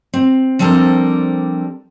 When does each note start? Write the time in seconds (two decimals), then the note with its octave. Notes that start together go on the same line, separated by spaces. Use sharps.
0.14 C4
0.59 F3 G3 C4 D4 A4 A#4